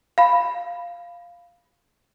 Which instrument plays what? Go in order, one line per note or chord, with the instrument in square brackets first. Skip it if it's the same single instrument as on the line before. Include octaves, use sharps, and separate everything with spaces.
[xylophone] F5 B5